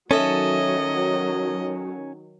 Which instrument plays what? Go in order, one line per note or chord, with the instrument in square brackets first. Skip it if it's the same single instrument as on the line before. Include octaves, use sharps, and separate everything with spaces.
[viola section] D#3 F#3 [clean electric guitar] C#4 [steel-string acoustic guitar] A4 E5 [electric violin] D#5